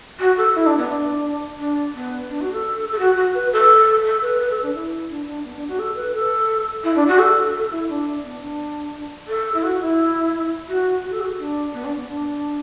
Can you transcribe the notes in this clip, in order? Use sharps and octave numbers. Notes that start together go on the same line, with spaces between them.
F#4
A4
E4
D4
B3
D4
D4
B3
D4
F#4
A4
A4
F#4
F#4
B4
A4
A4
B4
B4
A4
D4
E4
D4
D4
B3
D4
F#4
A4
B4
A4
E4
D4
F#4
A4
A4
E4
D4
B3
D4
A4
E4
F#4
E4
F#4
F#4
A4
F#4
D4
B3
D4
B3
D4